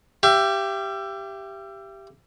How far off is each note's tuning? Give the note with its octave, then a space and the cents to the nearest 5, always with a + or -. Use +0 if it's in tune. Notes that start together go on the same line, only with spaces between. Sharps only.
G4 +0 E5 +40